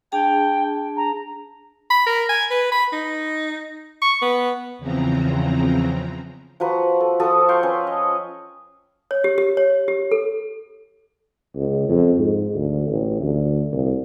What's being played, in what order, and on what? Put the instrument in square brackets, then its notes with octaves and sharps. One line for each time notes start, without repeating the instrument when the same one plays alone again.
[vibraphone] D4 G#4 A5 [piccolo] G5
[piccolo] A#5
[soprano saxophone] B5
A#4
G#5
B4
B5
D#4
C#6
B3
[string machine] E2 C#3 E3 F3 C4 A#5
[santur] F3 F#4 B4 A#5
A4
F3 F#4 A4 D#6
F5 G5 C6 C#6
C#4 B4 C#5
D#5
[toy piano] C#5
G4
G4
C#5
G4
A4
[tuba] C#2
F2
G#2
D2
A1
D2
C2